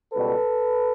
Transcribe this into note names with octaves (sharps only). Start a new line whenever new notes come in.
C#2 B2 G3 A4 B4